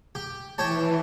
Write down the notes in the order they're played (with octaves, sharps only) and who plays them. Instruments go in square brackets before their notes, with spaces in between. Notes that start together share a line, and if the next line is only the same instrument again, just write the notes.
[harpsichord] G4
[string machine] E3 [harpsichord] G4 C#5 A5